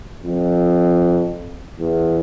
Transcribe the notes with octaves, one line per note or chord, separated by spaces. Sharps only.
F2
E2